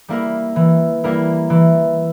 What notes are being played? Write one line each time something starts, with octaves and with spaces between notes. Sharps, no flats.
G3 A#3 E4 A#4
E3
G3 A#3 E4 A#4
E3